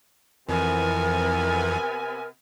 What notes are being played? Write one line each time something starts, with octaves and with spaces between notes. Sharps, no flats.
F2 C3 E3 B3 A#4 G#5